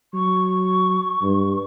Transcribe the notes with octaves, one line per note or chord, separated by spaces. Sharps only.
F#3 C#6
G2